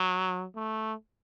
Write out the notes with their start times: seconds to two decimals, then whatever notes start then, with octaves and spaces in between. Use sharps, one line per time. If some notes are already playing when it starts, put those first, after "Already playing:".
Already playing: F#3
0.56 A3